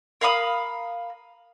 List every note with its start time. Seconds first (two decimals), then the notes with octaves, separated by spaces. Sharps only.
0.21 A#4 F5 B5 D#6